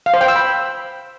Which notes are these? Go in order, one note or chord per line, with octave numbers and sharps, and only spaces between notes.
F5
C5
G5
E6
B5